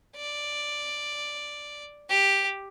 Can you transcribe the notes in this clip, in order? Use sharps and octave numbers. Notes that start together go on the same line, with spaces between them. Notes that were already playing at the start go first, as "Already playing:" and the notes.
D5
G4